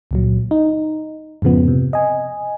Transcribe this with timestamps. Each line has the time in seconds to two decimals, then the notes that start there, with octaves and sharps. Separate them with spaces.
0.11 C#2 A#2 F#3
0.51 D#4
1.42 F2 G#2 C#3 F3 B3
1.68 C3
1.93 D#5 G#5